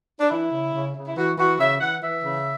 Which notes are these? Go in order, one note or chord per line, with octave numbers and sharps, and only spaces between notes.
D4
E3 E4
C#3
C#3
C#3
E4
E3 F#4
E3 F#4
C#3 E5
E3 F#5
E3 E5
C#3